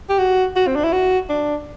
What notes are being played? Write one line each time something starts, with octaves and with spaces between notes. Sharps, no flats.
G4
F#4
F#4
C4
D4
E4
F#4
D4